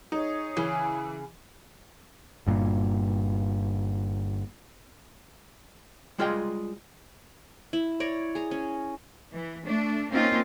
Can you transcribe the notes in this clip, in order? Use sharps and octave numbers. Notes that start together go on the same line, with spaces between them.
D#4 G#4 C#5
C#3 E3
G1 G2 A#2
G3 G#3 F4 G#4 D#5 G5
E4
C#5 D5 A#5
G#4 A#5
C#4
E3
A3 D4
A#3 C4 C#4 D#4 F4